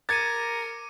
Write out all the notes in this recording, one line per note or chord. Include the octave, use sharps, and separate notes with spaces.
A#4 D6 G#6 A6 C#7 D#7